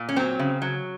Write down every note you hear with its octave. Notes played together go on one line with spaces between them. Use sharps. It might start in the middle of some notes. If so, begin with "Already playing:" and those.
Already playing: A#2
C#4
F#3 C4
C#3
F#3